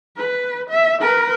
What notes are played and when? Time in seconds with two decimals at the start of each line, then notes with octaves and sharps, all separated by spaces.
0.17 B4
0.70 E5
1.01 A#4 B4